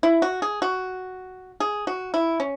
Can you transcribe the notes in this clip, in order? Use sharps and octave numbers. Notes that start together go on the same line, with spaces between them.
E4
F#4
G#4
F#4
G#4
F#4
E4
C#4